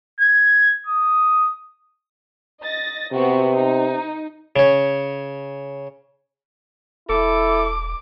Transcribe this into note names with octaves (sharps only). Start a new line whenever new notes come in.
G#6
D#6
D#5 A6 A#6
C3 B3 C4 F#4
D#4
C#3 C#4
E1 E4 A4 D6